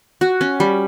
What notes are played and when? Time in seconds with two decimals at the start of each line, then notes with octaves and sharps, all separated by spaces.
0.21 F#4
0.41 C#4
0.60 G3